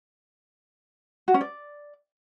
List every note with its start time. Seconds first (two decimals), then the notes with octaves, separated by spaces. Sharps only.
1.28 F#4
1.34 C#4
1.41 D5